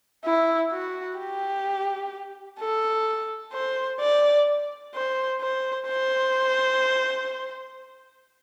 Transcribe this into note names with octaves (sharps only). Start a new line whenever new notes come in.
E4
F#4
G4
A4
C5
D5
C5
C5
C5